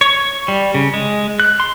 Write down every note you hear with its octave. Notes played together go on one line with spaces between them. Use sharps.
C#5
G3
C#3
G#3
F#6
C6